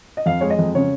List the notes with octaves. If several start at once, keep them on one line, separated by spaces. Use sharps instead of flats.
D#5
F2 F5
G#3 C#5
D#5
F2
C#3 C#5